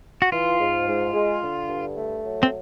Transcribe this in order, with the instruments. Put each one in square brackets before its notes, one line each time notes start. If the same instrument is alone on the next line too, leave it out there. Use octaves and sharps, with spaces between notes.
[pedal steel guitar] F#4
[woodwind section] E3 [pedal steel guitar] F4
[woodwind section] G#2
G#2
G#3
D3
G2
A3
F#3
[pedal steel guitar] C4